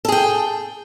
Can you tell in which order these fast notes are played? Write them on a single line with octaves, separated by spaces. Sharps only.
A4 G#4 G5